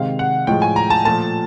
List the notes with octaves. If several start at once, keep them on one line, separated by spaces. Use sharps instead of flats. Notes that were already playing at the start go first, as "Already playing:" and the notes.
Already playing: C3 D#3 G#3 F5
F#5
A2 F3 G#3 G5
G#5
A#5
A5
A#2 F3 A3 A5